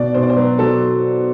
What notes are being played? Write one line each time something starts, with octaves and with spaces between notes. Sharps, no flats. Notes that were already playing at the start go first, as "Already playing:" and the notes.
Already playing: B2 D5
B2 C5
D5
C5
F#3 B4
F#3 A4